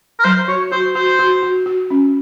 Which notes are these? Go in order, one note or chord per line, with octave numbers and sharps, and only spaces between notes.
A#4
F#3 C5
F#4 C#5
F#4 C5
F#4 C5
F#4
F#4
F#4
C#4